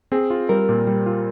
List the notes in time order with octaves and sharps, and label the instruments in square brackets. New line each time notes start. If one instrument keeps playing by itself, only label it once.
[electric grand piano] C4 [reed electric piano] G#4
[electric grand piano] F4
[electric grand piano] G3 [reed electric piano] A#4
[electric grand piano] A#2
G3
F4